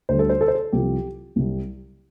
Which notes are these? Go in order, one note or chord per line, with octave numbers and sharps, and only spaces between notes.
D2 D3 G3 C5
A4
C5
A4
C5
A4
C2 C3 F3 G4
C2 C3 G3